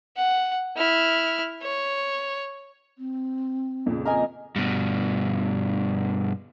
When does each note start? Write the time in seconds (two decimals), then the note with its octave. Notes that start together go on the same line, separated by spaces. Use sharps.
0.16 F#5
0.76 E4 F6
1.62 C#5
2.98 C4
3.86 F2 A#2 C#3
4.05 A#4 D#5 G#5
4.56 G2 B2